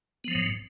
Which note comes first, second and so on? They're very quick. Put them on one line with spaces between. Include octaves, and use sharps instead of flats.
B3 F3 F#3 G#2